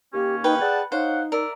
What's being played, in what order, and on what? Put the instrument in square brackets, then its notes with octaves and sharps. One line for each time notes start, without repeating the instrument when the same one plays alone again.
[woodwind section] D#2 A#3 C#4 [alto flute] G4
[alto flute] D#4 [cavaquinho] B4 G5
[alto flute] G#4 [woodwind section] D5 F#5 A5
[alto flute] D#4 [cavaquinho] C5 [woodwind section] C#5 F5 F#5
[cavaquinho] A#4 [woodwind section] D5 E5